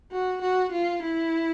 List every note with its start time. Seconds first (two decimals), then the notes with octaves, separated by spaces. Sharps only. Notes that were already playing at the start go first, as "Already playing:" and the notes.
0.12 F#4
0.41 F#4
0.72 F4
1.02 E4